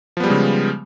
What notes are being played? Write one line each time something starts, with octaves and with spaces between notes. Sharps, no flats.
C#3 F3 G3 G#3 B3